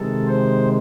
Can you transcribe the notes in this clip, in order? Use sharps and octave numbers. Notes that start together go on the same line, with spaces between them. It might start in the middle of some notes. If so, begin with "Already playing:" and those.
Already playing: C3 D#3 G#3 A4
C5